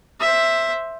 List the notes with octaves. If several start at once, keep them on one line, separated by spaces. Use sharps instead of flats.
C5 E5